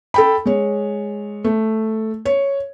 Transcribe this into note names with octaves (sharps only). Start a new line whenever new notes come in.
A4 G5 B5
G#3 C#5
A3
C#5